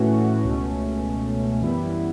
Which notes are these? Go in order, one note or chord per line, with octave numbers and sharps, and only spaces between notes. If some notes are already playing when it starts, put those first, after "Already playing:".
Already playing: A2 E3 A3 C#4 F#4
C#2 B2 A3 C#4
F#2 E3 G3 B3 E4